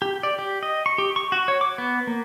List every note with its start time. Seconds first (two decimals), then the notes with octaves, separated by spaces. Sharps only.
0.02 G4
0.23 D5
0.39 G4
0.63 D#5
0.86 C#6
0.98 G4
1.16 C#6
1.32 F#4
1.48 C#5
1.61 D6
1.78 B3
2.07 A#3